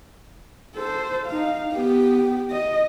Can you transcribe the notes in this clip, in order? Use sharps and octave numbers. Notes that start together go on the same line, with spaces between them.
A4 C5
D#4 F5
B3 G4
D#5